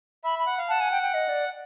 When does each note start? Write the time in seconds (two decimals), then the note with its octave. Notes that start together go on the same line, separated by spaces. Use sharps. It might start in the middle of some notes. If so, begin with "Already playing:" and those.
0.24 E5 B5
0.39 B5
0.46 F#5
0.58 F5
0.69 F#5 A5
0.81 G#5
0.91 G5
1.02 G5
1.14 D#5
1.29 D5